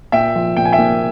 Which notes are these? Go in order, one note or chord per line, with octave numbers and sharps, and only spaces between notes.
A#2 E5 G5
F3
A#2 G5
G#5
E5 G5
A#3